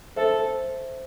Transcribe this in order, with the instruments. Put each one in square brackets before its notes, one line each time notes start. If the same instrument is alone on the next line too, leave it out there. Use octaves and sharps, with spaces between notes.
[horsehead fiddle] A4 [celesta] C5 E5